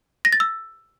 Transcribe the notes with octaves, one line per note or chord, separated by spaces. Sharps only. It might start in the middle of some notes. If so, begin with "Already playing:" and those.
A#6
A6
E6